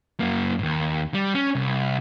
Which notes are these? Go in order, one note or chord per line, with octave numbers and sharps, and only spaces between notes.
F#2 A#3
D#2 G#2
G3
C#4
C2